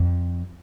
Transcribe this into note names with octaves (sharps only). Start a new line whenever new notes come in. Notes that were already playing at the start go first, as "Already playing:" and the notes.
Already playing: F2